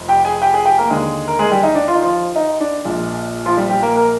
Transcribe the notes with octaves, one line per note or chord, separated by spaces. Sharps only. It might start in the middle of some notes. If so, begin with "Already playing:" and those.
Already playing: F1 F2
G4 G5
G#4 G#5
G4 G5
G#4 G#5
G4 G5
A#3 A#4
D#2 D3 G#3 G#4
A#4
G#3 G#4
G3 G4
D#4
D4
F4
D#4
F3 F4
D#4
D4
A#1 A#2 G#3
F3 F4
G3 G4
G3 G4
A#3 A#4
A#4